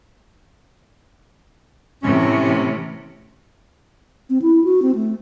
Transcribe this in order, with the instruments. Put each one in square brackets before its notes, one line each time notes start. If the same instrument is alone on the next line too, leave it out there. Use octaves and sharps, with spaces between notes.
[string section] A2 C3 E3 [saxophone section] C#4
[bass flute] C4
E4
F#4
C4
A3